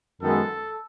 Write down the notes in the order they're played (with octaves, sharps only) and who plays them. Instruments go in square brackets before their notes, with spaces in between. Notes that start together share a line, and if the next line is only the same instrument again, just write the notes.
[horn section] F#2 D#3 G#3 B3 A4